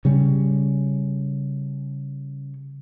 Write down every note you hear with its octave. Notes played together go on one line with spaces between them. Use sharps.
C#3 G3 C#4